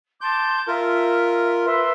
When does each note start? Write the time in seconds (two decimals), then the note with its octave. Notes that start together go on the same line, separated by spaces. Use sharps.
0.21 A5 C6 D6 G6
0.68 F4 A#4 E5
1.65 B4 E5 C6